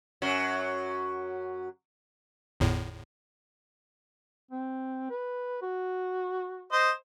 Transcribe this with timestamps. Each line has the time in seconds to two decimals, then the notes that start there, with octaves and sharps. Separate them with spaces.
0.22 F#2 F#3
2.60 G1 E2 A2
4.51 C4
5.10 B4
5.62 F#4
6.72 C5 D#5